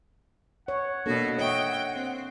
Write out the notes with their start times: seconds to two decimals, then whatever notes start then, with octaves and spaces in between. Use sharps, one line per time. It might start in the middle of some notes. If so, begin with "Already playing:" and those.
0.68 C#5 F#5
1.06 B2 A#3 D4 F#4 A4
1.38 C#5 D#5 E5 G5
1.93 C4